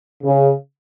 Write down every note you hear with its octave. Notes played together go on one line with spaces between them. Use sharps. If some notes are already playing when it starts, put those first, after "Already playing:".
C#3